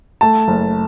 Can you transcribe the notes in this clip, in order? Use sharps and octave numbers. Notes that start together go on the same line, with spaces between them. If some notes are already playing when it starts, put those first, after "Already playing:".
A3 A5
F#1